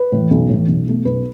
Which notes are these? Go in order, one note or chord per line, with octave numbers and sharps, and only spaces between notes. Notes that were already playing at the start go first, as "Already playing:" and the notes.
Already playing: B4
A2 E3
B1
A2 E3
B1
B2 A3
B1 B4